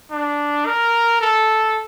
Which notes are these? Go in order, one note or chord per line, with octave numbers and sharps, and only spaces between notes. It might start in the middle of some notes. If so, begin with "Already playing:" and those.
D4
A#4
A4